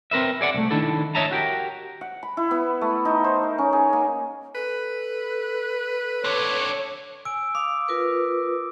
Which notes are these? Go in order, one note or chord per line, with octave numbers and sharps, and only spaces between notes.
C4 A#4 B4 E5
G#4 D5 F#5
C2 A3
D#3 D4 E4 A4
C#5 D#5 E5 A5 A#5
F#4 G4 A#4
F#5
B5
E4
B3
A3
D#4
C5
A#4
C#4
G#4
A#3
A4 B4
C4 D4 C#5
G#5 E6 D7
F5 D6 D#6
F4 A#4 B4